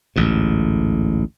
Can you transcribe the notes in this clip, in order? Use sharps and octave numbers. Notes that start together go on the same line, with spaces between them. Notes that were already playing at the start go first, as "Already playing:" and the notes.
A1 D2 G#2